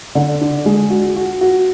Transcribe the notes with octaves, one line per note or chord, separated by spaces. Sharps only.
D3
D4
G#3
F#4
F#4
F#4